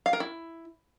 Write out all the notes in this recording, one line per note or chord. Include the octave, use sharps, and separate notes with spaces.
F5
A#4
E4